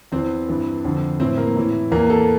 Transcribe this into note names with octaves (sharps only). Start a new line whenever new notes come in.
E2 E3 C4
G2 E3
F2 D3
A2 E3 C4
A#3
A2 E3
E2 E3 A#3
A4